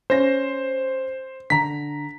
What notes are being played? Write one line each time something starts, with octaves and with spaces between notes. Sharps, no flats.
C#4 C5 A#6
D3 A#5 B6